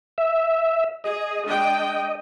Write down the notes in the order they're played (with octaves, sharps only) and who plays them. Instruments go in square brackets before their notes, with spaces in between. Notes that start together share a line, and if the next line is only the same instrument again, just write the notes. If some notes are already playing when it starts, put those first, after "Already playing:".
[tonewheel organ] E5
[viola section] G#4 [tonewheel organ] D#5
[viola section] G#3 D4 G5